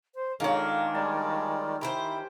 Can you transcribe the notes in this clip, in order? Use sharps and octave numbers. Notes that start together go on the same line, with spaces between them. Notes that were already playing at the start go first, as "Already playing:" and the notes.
C5
D#3 G#3 A#3 D4 F4 A4 C#5
G3 G#3 D5 G#5 A5
E4 G4 A#4 C5